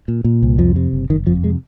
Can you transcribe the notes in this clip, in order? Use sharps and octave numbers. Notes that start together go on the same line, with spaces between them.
A#2
A#2
C2
F2 F3
C3
F#1
F#1 D#3
F2 F3
C3 G#3